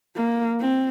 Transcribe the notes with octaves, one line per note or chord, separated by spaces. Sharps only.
A#3
C4